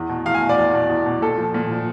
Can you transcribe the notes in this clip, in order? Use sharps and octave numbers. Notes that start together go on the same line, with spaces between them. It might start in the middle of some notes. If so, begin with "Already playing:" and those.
Already playing: E2
B2
E2 F5
G#5
B2
D5
E2
B2
E2
B2
A#2 A4
F3
A#2
F3